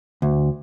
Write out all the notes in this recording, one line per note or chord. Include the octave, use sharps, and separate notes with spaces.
D2